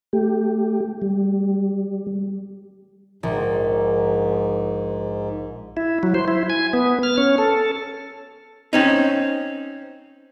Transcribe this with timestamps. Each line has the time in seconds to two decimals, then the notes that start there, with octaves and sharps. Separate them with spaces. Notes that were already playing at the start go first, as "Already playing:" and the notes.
0.13 A3 G4
1.02 G3
3.23 A#1 G#2
5.77 E4
6.03 F#3
6.14 C5
6.28 E4
6.50 G#5
6.73 B3
7.03 F6
7.18 C#4
7.38 A4
8.73 C4 C#4 D#4